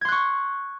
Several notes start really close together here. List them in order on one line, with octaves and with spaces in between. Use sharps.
G#6 C6 F#6 C#6